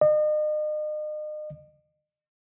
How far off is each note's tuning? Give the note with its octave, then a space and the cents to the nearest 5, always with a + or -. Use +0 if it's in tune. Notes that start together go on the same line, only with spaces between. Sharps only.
D#5 -40